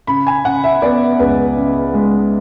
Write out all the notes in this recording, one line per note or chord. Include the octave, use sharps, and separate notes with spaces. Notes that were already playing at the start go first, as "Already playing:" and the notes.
C#3 B5
G#5
C#3 F#5
E5
B3 D5
C#2 B4
C#3
G#3